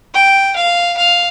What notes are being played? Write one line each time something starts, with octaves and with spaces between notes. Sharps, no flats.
G5
F5
F5